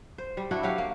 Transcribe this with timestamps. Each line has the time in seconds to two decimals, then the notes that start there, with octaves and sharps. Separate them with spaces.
0.18 C5
0.37 G3
0.51 A3 D4 E4 F#4
0.63 F#3 F#4 G4 F5
0.78 A#3